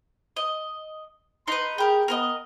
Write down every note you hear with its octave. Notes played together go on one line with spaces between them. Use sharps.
D#5
D#4 B4 C6
G4 G#4 A#4
B3 A#4 B4 D#5